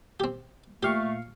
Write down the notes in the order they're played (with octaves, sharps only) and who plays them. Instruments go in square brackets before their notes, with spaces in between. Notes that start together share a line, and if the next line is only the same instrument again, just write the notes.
[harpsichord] C4 G4
[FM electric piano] A#2 F5 C#6 [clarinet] A3 [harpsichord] G4